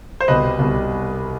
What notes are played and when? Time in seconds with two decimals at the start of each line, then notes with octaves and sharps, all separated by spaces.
0.20 C5
0.28 C2 B2 G3 B4 D#5
0.59 C2 B2 G3